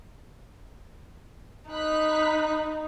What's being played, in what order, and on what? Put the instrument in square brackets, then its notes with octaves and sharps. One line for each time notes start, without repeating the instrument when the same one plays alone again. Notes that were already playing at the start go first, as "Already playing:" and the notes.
[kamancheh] D#4 [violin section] B5 F#6 B6